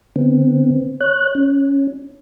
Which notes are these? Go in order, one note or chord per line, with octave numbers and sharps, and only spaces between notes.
D3 B3 C4
C#5 F#6
C#4